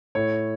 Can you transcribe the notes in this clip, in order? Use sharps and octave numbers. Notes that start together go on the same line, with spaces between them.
A2 C#5